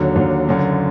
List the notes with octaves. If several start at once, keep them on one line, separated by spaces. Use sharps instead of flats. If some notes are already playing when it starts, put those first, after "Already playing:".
Already playing: D#2 D3 F#3
D#2 D3 F#3
F#1 F#2 D3